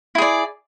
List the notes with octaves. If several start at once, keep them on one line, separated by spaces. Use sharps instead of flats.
E4 G#4 D5